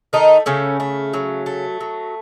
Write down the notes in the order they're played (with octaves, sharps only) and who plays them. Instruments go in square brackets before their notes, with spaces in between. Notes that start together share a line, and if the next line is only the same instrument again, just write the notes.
[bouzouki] D#3 A3 D#4
C#3 A3 C#4
A3
F#3
A3
F#3